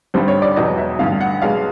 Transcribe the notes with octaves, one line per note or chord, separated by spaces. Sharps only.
G#1 G2 D3 G3 C5
C#5
D5
E1 E2 B2 F#3 D#5
E5
A1 G2 D3 F5
F#5
B1 B2 G#3 F5